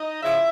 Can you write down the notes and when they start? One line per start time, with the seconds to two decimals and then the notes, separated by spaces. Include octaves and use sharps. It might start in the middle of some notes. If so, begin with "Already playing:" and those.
Already playing: D#4 D#5
0.23 C#3 F3 E4 E5